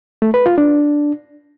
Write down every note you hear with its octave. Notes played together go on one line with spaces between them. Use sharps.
A3
B4
F4
D4